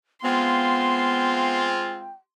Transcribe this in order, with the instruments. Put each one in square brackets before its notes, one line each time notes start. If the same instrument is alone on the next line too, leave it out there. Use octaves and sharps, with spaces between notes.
[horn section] G#3 C4 F4 [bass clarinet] B3 [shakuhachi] G5 [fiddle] C6